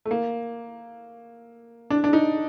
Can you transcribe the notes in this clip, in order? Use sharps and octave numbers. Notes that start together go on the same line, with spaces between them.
A3
A#3
D4
D4
D#4